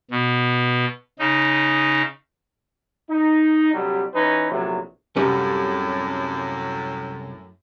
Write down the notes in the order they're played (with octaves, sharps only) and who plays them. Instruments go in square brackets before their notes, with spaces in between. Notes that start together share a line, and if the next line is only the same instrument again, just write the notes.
[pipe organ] B2
C#3 D#4
[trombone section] D#4
C2 D3 F#3 G3
E3 C#4 D#4 B4
A#1 E2 A2 C3 F#3
[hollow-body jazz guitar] C2 G3 C#4 [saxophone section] F#2 A2